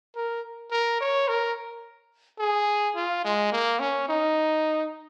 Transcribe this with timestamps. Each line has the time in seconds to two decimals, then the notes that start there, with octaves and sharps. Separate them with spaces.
0.16 A#4
0.71 A#4
1.00 C#5
1.28 A#4
2.39 G#4
2.96 F4
3.25 G#3
3.52 A#3
3.80 C#4
4.09 D#4